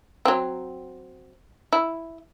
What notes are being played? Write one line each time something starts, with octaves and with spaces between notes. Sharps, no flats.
F#3 C4
E4